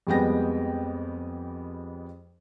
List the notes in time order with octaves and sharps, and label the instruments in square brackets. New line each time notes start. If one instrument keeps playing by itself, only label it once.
[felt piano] F2 G3 G#3 B3 G5 A#6